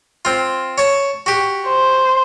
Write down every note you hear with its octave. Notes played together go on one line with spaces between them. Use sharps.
C4 F4
C#5 A5
F#4 G4
C5